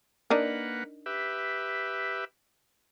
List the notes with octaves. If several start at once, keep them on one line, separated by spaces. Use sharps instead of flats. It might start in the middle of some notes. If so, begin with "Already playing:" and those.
A#3 D4 D#4 A#4 B4 F#5
G4 B4 E5